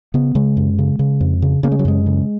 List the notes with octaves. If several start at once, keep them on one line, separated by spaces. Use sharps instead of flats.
C#3 B3
C#3 G#3
F#2
C#3
C#3
F2
C#3
C#3 A#3
G#3
F#3
F#2 G#3
C#3